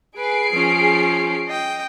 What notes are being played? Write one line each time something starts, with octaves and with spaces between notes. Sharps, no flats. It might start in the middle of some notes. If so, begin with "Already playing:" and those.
G#4 B4 C7 D7
F3 C#4
D#5 G5